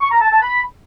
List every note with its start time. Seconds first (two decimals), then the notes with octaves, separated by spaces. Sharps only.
0.01 C#6
0.11 A#5
0.21 A5
0.31 A5
0.41 B5